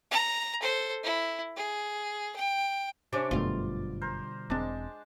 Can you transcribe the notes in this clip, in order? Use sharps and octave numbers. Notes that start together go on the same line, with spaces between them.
A#5
A4 C5
E4
G#4
G5
C3 C#4 D4 D5
G1 F#2 B2 D3 G3 A3 F4
A#4 C5
E1 G#3 C4 D4 A5